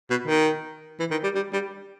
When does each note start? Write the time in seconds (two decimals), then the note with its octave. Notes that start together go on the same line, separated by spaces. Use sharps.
0.10 B2
0.27 D#3
0.99 E3
1.11 D#3
1.23 G3
1.35 G3
1.53 G3